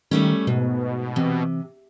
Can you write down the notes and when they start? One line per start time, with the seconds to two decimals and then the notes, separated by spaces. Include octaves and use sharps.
0.11 D#3 G3 A3 C#4
0.47 G#2 B2
1.16 C3 E3 C4